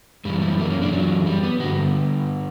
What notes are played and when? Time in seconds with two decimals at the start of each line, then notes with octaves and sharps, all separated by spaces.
0.25 F#2 E3 G3
0.42 G3
0.60 A#3
0.70 C#4
0.82 D4
0.93 F#3
1.26 G3
1.43 B3
1.60 G2 D3 F#4